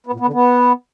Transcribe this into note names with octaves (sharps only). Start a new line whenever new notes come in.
B3
A#2
B3
D3
B3